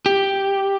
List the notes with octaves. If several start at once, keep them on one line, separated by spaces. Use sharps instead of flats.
G4